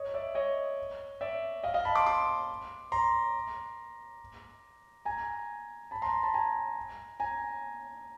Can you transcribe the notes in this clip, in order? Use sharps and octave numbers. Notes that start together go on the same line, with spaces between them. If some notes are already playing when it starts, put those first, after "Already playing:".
Already playing: C#5 D#5
D5 E5
C#5 D#5
D5 E5
D#5 F5
D#5 F5
A5 B5
C6 D6
C6 D6
A#5 C6
G#5 A#5
A5 B5
A#5 C6
A5 B5
G#5 A#5
G#5 A#5